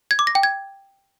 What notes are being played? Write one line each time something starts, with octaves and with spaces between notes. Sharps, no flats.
G#6
D6
A#6
G5
G#6